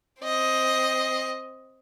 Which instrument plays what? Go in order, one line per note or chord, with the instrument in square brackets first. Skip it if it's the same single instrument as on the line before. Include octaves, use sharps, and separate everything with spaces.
[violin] C4 D#5